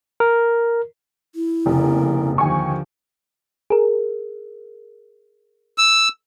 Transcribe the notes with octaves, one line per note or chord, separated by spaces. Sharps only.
A#4
E4
F1 C#3 A#3
D#2 D3 F3 G#5 C#6
G#4 A#4
E6